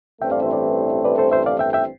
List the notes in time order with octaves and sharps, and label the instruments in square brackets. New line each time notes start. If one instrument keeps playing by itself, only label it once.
[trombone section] A1 G2 E3 A3 C4 [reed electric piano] E5 G5
[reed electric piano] D5 F5
C5 E5
B4 D5
B4 D5
A4 C5
C5 E5
D5 F5
E5 G5
E5 G5